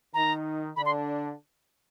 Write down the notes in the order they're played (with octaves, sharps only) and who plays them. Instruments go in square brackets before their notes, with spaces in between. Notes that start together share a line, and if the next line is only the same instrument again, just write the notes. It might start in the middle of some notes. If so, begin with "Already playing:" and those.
[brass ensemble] D#3 D#4 [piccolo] A#5
[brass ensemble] D3 D4 [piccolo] B5
[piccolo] C6